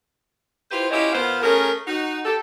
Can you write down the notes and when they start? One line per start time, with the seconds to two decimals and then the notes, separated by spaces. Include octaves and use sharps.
0.71 E4 F4 G4 B4 C5
0.91 C#4 E4 F4 G4 C#5 D#5
1.13 A#2 B3 F4 C5 F5
1.42 A3 C#4 G#4 A#4
1.87 D#4 F#4
2.25 G4 A4